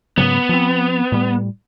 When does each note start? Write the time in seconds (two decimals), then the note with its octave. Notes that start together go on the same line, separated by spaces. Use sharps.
0.18 G#2 C#3 F#3 B3
0.49 F3 C4
1.12 A2 G3